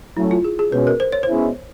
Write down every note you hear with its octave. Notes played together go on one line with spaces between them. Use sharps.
F#3 A3 C#4 E4
F4
G#4
G#4
B2 G#3 C#4 B4
A#4
C5
C#5
C5
B2 G#3 C#4 E4